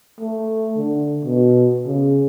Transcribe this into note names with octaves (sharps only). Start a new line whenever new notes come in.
A3
D3
B2
C#3